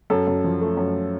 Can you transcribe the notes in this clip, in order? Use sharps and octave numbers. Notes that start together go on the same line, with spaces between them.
F#2 A4
F#2
F3
A3
F#2